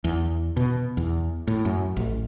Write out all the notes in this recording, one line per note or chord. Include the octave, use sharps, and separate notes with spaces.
E2
B2
E2
A2
F#2
A1